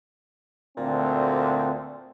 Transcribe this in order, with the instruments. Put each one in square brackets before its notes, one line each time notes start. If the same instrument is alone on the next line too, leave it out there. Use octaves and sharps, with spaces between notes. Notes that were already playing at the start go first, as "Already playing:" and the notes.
[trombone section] D2 C4 [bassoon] A#2